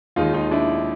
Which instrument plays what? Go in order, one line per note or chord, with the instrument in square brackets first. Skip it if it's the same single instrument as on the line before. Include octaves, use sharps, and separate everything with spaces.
[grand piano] D#2 D#3 G#3 D#4 F4
D#4 F4
D4 E4